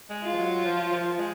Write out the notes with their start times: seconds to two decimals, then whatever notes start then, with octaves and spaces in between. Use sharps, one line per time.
0.10 G#3
0.23 F4
0.32 F3
0.38 F#3
0.65 F3
0.92 F3
1.19 G#3